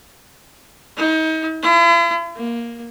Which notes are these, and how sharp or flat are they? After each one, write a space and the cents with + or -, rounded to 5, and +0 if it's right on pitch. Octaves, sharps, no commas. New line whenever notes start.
D#4 +35
E4 +45
A#3 +10